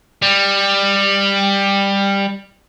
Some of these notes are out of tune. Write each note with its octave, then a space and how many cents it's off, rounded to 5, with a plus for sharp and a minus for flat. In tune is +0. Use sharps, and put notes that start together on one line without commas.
G3 +15